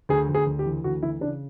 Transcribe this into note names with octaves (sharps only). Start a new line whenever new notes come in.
D2 G#4
D2
G#4
D2
G4
E3
D2 F#4
E3 E4
C#3 D4